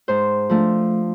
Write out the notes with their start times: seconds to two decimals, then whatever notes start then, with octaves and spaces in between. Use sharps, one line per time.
0.08 G#2 C5
0.49 F3 A3 D4